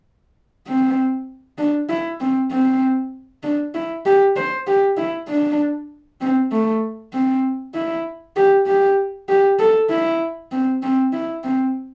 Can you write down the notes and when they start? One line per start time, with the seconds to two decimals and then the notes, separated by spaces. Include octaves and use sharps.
0.67 C4
1.59 D4
1.89 E4
2.20 C4
2.52 C4
3.43 D4
3.75 E4
4.05 G4
4.36 C5
4.67 G4
4.97 E4
5.29 D4
6.21 C4
6.51 A3
7.13 C4
7.75 E4
8.36 G4
8.67 G4
9.29 G4
9.59 A4
9.90 E4
10.52 C4
10.82 C4
11.13 E4
11.44 C4